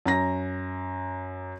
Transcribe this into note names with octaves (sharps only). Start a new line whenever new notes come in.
F#2 A#5 A#6